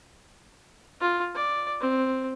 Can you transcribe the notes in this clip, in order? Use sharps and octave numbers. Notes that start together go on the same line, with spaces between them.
F4
D5
C4